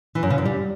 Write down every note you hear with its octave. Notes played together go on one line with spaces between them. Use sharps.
E3
F#2
C#3
F#2
G3